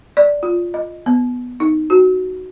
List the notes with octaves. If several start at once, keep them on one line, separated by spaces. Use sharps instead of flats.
D5
F4
D#5
B3
D#4
F#4